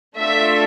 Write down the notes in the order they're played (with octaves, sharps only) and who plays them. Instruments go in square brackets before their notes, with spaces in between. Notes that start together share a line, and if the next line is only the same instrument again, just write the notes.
[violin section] A3 D4 F4 A4 E5